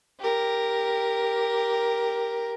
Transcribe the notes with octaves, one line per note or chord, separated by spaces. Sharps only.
G4 A#4